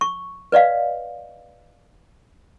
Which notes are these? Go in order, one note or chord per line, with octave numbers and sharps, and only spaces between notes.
C#6
B4 D5 D#5 F5